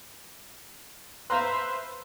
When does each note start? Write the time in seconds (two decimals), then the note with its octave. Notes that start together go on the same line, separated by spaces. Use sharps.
1.30 B4 C5 E5 F5 A#5 C6